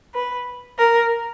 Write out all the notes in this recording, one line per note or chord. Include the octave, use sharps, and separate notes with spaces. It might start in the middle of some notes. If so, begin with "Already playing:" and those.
B4
A#4